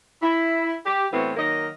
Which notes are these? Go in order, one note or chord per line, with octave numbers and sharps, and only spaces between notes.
E4
G4
A2 E3 B3 C4 F#4
D#3 F#3 A#3 A#4 D#5